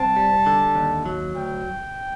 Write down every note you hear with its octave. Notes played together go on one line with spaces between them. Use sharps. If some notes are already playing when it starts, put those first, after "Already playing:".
Already playing: C2 C4 A5
G3
D3
D#2
F#3
D2 G5